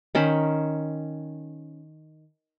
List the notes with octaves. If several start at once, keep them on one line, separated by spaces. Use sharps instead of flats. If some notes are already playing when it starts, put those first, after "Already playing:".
D#3 C#4 C5 B5